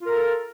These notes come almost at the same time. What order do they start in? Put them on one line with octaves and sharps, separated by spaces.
F4 A#4 A4